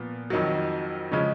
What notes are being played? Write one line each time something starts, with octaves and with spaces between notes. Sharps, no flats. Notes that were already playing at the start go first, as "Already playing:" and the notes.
Already playing: A#2 F3 B3
F2 D#3 F#3
C#3 F3 G#3 C#4